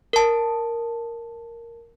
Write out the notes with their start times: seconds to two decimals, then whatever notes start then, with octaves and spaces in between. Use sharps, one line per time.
0.13 A#4 A5